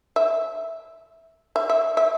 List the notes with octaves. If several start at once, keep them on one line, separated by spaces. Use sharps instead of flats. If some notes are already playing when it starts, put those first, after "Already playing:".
E5
E5
E5
E5